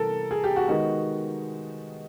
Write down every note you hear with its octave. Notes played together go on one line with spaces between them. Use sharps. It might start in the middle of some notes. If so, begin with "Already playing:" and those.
Already playing: C3 E3 G3 A4 A#4
G#4
G4
F#4
D#3 G#3 B3 D#4 F#4